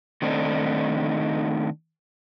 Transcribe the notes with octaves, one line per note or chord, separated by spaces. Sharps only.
D#3 A3 C4 D4 D#4